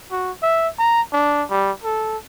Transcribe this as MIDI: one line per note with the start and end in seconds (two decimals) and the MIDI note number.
0.11 0.31 66
0.42 0.68 76
0.79 1.01 82
1.13 1.44 62
1.50 1.72 55
1.84 2.17 69